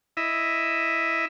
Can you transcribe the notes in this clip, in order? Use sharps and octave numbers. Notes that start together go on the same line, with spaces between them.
E4 D#5 E5